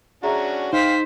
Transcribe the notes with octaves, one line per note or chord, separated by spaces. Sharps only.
C#4 D4 F#4 G#4 E5 A#5
D#4 C5 F5 G5 B6